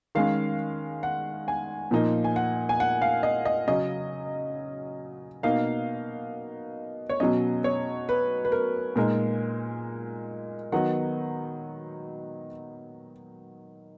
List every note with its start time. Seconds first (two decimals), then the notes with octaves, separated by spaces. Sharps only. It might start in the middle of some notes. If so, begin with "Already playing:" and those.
0.15 D#3 G#3 C#4 F5
1.03 F#5
1.48 G#5
1.91 A#2 F3 A#3 D#4
2.24 G#5
2.36 F#5
2.69 G#5
2.80 F#5
3.02 F5
3.23 D#5
3.45 D#5
3.68 C#3 F#3 C#4 D#5
5.43 B2 A#3 D#4 F5
7.09 C#5
7.20 B2 F#3 C#4 D#5
7.64 C#5
8.09 B4
8.45 B4
8.52 A#4
8.96 A#2 G#3 D#4 A#4
10.72 D#3 F#3 B3 D#4 F#5